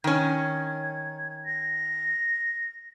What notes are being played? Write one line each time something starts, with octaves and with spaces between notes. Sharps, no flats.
D#3 C#4 G#6
A#6